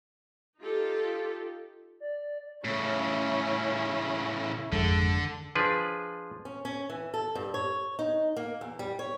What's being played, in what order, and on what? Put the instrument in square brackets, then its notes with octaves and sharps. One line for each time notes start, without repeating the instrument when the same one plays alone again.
[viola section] D#4 F4 G4 A4
[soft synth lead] D5
[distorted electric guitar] A2 C#3 [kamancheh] C#4 E4
[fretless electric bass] G#1 F2 G#3 [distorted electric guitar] D3 [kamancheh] A4
[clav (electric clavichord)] F3 D4 G#4 B4
[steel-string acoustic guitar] C#4
C#4
E3
A4
G2
C#5
D#4
A#3
E2
G3
C#5